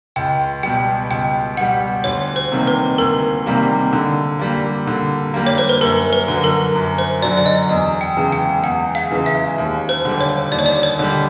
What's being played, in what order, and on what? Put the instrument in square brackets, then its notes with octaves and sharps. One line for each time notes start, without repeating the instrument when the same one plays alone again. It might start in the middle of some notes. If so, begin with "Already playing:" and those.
[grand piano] C#2 [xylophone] G5
[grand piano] B2 G3 [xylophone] G5
[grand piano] C#2 [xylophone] G5
[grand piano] B2 G3 [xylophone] F#5
[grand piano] D2 [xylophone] C#5
[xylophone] C5
[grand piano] C3 D#3 G3 A#3
[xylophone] B4
[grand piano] D2 [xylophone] A#4
[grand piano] C3 D#3 G3 A#3
D3
G3 A#3
D3
G3 A#3
[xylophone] C#5
C5
B4
[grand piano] F#2 [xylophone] A#4
[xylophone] B4
[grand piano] D3 F#3
[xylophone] A#4
[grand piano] F#2
[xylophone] C5
[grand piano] D3 F#3 [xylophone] D5
[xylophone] D5
D#5
[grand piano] E2
[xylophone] G5
[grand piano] C#3 E3 G#3
[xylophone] G5
[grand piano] E2 [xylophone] F#5
[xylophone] F5
[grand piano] C#3 E3 G#3
[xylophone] E5
[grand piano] D#2
[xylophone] C5
[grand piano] D3 G3
[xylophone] C#5
[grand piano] D#2 [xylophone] D5
[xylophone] C#5
D5
C#5
[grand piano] D3 G3